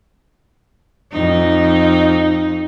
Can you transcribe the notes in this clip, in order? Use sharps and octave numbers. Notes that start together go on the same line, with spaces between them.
F2 D#4